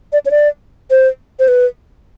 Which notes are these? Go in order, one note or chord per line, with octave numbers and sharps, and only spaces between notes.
D5
C#5
D5
C5
C5
B4